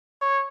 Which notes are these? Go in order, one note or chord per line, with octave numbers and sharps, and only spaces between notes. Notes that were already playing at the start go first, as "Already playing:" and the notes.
C#5